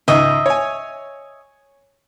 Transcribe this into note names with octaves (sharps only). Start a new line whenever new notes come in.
C#2 G#2 D#5 E5
C#5 G#5